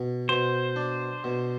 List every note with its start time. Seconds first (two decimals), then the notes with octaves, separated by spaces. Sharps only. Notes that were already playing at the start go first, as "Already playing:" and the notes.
Already playing: B2
0.29 B2 C5
0.76 D4
1.24 B2